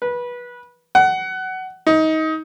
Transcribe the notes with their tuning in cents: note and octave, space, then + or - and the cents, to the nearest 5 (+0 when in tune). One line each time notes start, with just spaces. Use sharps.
B4 -20
F#5 +20
D#4 +25